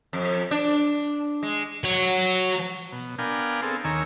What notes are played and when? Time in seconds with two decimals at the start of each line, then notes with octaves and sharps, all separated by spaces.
0.13 F2
0.51 D4
1.43 G#3
1.84 F#3 C#5
2.92 B2
3.19 B3 D4 A#4 F5 G5 G#5
3.62 C4 G#4 A4
3.84 D#2 D#3 A#4 C#5 G#5 E6